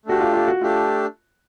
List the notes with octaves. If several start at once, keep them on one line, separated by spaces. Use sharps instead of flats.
A3 D4 F#4 G4
F4
F4
F#4
A3 D4 F4 G4